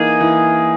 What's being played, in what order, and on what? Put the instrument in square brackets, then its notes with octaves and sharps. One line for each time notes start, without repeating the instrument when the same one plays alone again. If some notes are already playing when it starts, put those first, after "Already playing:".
Already playing: [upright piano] E3 A#3 D#4 [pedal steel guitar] G#4
[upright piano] E3